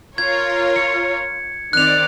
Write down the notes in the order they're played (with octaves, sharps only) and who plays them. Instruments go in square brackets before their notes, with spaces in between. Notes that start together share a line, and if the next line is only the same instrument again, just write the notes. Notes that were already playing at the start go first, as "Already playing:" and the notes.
[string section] F4 A#4 C#5 [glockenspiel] G#6
[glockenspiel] C#7
[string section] D#3 C4 D5 [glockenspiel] F#6 F7